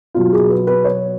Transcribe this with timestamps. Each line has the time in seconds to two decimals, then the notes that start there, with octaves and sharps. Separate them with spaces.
0.15 B2 F#3 F4
0.33 G#4
0.49 B4
0.67 B4
0.85 C#5